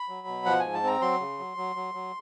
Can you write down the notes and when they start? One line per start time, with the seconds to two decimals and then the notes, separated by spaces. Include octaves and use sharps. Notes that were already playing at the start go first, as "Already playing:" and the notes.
Already playing: B5
0.09 F#3
0.27 B2
0.46 F3 F#5
0.60 G#2 G#5
0.74 A5
0.83 C4 A#5
1.01 F#3 C6
1.20 C#3
1.39 F#3
1.57 F#3
1.76 F#3
1.94 F#3